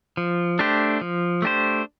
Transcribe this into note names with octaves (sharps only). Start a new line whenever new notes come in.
F3
A3 D4 G4 C5
F3
A3 D4 G4 C5